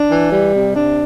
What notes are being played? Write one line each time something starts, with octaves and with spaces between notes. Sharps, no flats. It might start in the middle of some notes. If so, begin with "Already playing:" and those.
Already playing: D4
E3
G3
C3
D4